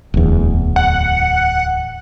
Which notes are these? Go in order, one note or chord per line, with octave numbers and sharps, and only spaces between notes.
D1 E2
F#5